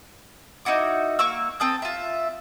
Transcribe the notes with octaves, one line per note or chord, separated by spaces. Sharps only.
D#4 E4 F#4 D6
A#3 C#6 E6
C4 A4 D#6 G6
F4 E5